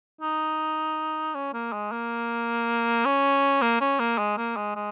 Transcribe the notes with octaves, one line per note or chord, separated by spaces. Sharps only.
D#4
C#4
A#3
G#3
A#3
C#4
A#3
C#4
A#3
G#3
A#3
G#3
G#3